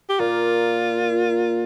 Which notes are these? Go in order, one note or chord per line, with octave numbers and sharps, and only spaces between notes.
G4
A#2 A#3 F4